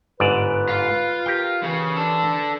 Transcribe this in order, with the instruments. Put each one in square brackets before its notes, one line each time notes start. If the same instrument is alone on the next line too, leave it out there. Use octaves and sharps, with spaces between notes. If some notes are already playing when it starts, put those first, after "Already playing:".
[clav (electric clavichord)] G1 G#2 D5 [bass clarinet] B4
[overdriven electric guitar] F4
[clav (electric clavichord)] G4 A#4 G5
[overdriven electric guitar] C#3 [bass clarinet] E3
[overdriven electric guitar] D4 A4